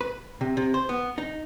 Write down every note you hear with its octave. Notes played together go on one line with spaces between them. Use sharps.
B4
C3
C3
C5
B3
D#4